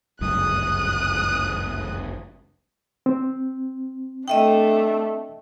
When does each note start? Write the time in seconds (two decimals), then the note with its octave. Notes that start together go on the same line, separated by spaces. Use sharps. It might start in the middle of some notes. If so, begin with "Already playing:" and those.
0.21 G1 C#2 F#2 D#6 F#6
3.06 C4
4.28 A3 D4 D#5 E5 G5